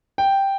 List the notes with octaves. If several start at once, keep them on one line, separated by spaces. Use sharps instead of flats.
G5